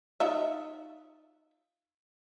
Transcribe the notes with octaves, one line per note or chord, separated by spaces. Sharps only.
D#4 F4 E5